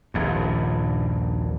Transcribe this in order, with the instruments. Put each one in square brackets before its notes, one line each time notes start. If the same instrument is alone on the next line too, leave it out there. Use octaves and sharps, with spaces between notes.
[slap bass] D#1 A#1 G2